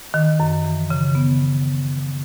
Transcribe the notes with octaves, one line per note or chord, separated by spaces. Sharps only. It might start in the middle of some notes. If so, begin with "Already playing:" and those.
D#3
F#2
E3
C#3
B3